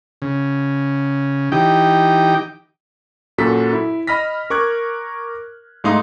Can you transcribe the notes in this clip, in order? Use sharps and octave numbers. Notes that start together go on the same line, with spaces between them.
C#3
E3 D#4 G4 G5
F#2 A#2 F#4 A4 B6
E4
D#5 B5 F6 A#6 B6
A#4 C#6 D6 F#6 G#6
G#2 A3 D#4 F5 C6 D#6